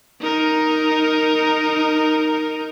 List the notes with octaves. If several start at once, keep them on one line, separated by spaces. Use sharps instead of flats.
D#4 A#4